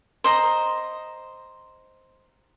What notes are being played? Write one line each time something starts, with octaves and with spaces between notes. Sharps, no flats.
C5 D#5 A#5